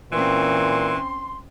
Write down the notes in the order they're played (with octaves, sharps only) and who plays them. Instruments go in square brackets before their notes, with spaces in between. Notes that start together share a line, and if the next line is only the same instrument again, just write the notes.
[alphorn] A#2 [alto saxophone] E3 [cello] C4 C#4 [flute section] C6